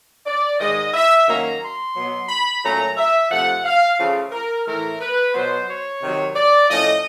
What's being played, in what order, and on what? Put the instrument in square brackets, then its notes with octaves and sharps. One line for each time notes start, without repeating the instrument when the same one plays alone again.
[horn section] D5
G#2 D#3 G#3 D#5
E5
F#2 D#3 F#3 A#3 C#4 A#5
C6
B2 F#3 B3
B5
A#2 F#3 A3 C#4 A#5
E5
C3 F3 A3 F#5
F5
C#3 F3 A3
A#4
A2 E3 A3 A#4
B4
B2 F#3 B3 C5
C#5
C3 D#3 F#3
D5
A2 F3 A3 C#4 D#5